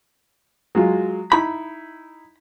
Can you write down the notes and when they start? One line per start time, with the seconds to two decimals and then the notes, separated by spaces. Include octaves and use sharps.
0.75 F#3 G#3 F4
1.32 D#4 E4 B5